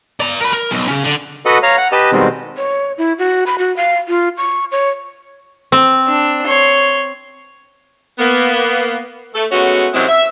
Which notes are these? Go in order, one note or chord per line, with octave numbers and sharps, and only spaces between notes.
D5 A#5
A#4 B5
A#4
B1
C#3 C#4
D3
F#4 A4 B4 D#5 F#5
C#5 F5 A#5
F#5
G4 B4 D#5 A5
B2 D#3 G3 G#3 C4
C#5
E4
F#4
B5
F#4
F5
F4
C#6
C#5
C4
D4
C#5 C6
A#3 B3
A3 A4
G#3 A3 B3 C#4 F#4
F#2 C3 F#3 G#3 C4 E4
E5